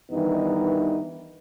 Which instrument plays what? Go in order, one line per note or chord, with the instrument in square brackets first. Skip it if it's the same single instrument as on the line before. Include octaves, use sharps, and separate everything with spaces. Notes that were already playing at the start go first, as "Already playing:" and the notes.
[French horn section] G2 D#3 E3 G3 B3 D#4